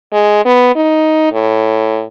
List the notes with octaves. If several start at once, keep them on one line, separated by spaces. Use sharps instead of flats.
G#3
B3
D#4
A2